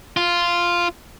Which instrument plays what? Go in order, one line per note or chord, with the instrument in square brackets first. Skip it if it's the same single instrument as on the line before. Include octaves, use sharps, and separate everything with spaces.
[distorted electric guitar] F4